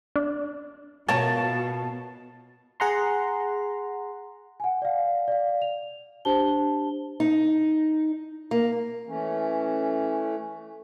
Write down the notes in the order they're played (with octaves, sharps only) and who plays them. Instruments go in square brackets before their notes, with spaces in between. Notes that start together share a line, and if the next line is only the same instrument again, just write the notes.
[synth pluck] D4
[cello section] B2 [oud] F4 A#4 C#5 [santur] A5
[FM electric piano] G#4 F#5 A#5 C6
[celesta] F#5 G#5
D5 F5
D5 F5
F7
D4 G4 C5 A5 G7
[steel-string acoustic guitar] D#4
A#3
[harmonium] E3 A3 C#4